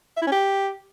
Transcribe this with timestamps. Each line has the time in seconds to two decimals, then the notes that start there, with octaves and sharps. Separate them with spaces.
0.17 E5
0.22 E4
0.27 C#4
0.32 G4